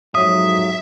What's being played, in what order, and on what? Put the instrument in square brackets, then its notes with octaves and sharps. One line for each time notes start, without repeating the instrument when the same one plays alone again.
[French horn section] F2 G#2 F#3 [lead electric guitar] E5 [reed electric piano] D#6